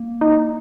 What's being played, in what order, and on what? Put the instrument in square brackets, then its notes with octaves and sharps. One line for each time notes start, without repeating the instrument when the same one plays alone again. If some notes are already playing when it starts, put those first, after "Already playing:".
Already playing: [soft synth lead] A#3
[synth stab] D#4